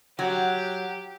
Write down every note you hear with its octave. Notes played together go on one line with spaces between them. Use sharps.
F#3 G4 F#5